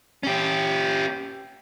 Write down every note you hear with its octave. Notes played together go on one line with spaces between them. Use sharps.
C#4 G4